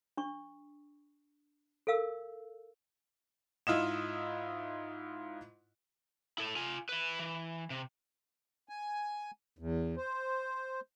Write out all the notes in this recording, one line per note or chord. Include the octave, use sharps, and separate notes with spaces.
D4 C#6
A4 A#4 F5 E6
G#2 E4 F4 D#5 E7
E4 A4
F4 G#5
E4 B4
E3
C3
G#5
E2
C5